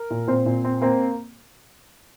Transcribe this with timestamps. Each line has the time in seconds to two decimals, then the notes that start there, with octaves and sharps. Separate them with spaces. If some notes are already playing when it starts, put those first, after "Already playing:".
Already playing: A#4
0.10 A#2
0.28 A#2 C4 C5
0.46 A#2
0.65 C4
0.81 A#3 C4 C5